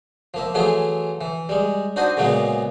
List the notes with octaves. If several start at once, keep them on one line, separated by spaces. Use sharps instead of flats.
F3 A#3 E5
E3 F#3 A3 F4 G#4
E3
G3 G#3
D4 D#4 F#4 C5 D#5 F#5
A#2 C#3 F#3 G#3 A#3 B3